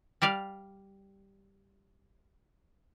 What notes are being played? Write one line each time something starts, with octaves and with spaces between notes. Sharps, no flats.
G3 G4 D5 F5